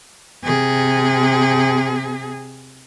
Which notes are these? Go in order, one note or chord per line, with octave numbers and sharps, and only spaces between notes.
C3 G#4